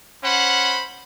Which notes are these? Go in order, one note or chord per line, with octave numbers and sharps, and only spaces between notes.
C#4 C5 F#5 B5